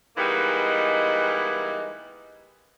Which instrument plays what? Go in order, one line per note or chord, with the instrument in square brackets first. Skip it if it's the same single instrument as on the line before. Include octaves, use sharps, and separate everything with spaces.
[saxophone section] E3 G3 G#3 A#3 B3 D#4